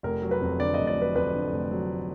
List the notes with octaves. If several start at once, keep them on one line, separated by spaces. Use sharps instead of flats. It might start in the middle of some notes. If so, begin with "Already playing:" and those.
F1 A#4
F#3
B4
F2
D3 D5
D#5
F1
D5
F#3 B4
F2 B4
D3
F1
F#3